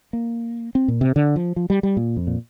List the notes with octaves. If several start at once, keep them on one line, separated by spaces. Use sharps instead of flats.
A#3
C4
A#2
C3
D3
F3
F3
G3
G3
A#2
F2
A#2